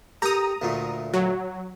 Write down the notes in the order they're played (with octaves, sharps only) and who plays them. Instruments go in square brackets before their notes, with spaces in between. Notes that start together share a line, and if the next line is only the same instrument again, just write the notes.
[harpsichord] G4 A4 A#4 [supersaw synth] A#5 D#6
[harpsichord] D2 A#2 A3
[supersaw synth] F#3